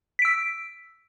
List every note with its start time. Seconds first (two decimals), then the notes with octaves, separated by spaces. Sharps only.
0.19 B6
0.22 D7
0.25 E6